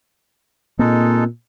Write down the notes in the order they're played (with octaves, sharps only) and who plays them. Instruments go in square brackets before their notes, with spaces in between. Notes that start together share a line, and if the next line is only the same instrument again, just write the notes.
[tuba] A#2 [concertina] G#3 D#4 A4 [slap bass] A#3 C4